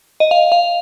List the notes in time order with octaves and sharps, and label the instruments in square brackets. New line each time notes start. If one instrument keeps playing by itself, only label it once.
[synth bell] D#5
F5
F5